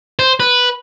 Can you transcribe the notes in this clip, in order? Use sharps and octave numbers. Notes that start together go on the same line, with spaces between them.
C5
B4